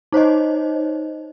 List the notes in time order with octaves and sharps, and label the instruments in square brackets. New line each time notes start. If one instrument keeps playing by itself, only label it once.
[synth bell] D#4 C5 C#5 D#5